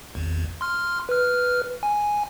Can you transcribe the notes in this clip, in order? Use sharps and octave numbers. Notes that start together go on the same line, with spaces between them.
G#1 E2
C6 F6
B4 F6
G#5